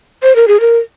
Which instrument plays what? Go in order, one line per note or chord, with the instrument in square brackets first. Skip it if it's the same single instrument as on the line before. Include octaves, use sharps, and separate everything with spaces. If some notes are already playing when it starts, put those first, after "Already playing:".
[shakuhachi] C5
A#4
G#4
A#4